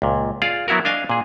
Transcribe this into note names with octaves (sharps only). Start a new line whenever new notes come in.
C#2 A#2
F4 G#4 D5 F5
F#3 B3 E4 F#4 A#4
D4 D#5 F5 G#5
A#2 G#4